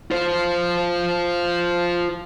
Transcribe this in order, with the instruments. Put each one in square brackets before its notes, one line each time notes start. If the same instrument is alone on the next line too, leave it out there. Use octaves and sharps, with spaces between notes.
[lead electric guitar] F4 C5